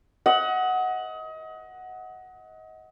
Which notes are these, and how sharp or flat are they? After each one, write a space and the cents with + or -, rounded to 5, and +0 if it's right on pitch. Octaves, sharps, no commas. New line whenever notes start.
D#5 +30 F#5 +0